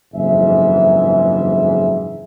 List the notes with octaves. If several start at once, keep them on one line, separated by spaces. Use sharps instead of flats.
F#1 F2 G#2 E3 G#4 E5